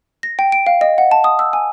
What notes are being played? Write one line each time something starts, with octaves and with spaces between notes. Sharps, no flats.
A#6
G5
D7
F5
D#5
F#5
A5
D#6
E6
G#5